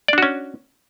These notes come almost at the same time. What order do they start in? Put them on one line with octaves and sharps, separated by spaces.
D5 D4 F#4 C#4